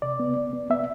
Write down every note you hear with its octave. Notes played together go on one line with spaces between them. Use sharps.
C3 D5
B3
B3
B3
B3 E5